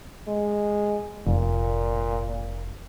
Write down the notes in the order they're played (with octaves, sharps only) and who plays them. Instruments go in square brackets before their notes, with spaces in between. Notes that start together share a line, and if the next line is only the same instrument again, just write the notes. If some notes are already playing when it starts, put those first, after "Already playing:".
[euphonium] G#3
[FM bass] F1 [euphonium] A#2